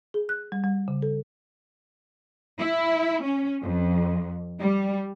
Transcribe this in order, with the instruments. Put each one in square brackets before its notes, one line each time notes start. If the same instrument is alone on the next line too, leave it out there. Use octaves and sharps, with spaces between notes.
[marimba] G#4
F#6
G3
G3
C#3
A4
[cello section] E4
C#4
F2
G3